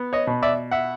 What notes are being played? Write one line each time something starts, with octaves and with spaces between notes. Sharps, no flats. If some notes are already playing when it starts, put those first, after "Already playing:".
Already playing: B3
C#5 D#5
B2
D5 E5
E5 F#5